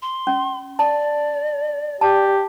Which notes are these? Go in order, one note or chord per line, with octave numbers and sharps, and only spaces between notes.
C6
C#4
D5 A5
G4 D5 A5